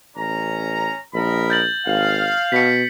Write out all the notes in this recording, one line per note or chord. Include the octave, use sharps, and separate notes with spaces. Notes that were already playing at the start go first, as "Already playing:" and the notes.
A1 C#4 A#5
A#1 A#4 D#5 B5
G6 A6 F#7
G#1 F5
B2 B6 C#7